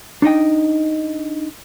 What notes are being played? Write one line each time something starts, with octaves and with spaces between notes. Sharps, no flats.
D4 D#4 D#5 G5